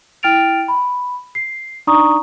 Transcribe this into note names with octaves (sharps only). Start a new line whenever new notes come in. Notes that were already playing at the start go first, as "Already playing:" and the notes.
E4 G5 F6 A6 D7 F7
B5
C7
D4 D#4 D5 A#5 C#6 D#6